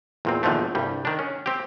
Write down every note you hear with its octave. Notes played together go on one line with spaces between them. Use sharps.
E2 A#2 C4
E2 A#2 D3 D#3 F3 A3
C2 G2 G3
D#3 D4
C#4
C4 G4